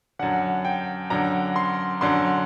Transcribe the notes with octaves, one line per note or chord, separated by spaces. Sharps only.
F#2 D3 F#5
G5
F#2 D3 A#5
C6
F#2 D3 C6